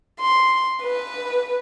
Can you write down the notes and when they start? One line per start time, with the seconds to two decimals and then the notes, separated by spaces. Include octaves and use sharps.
0.21 C6
0.83 B4